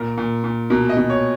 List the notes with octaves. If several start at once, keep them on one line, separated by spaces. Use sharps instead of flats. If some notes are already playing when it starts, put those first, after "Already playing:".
Already playing: A#2 A#4
A#2
A#2
B2 A#4
D#5
B2
C#5